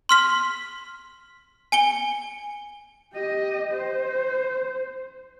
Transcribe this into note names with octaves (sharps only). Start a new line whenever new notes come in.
C6 F6 B6
G#5 C#7 G7
G4 D#5
C5